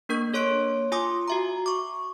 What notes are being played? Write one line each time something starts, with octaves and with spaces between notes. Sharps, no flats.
A#3 D4 A#4 C#6 G6
A#3 A4 C#5 C6 F#6 D7
F4 G#5 C6 D6 D#6
F#4 E5 A#5
C#6 D6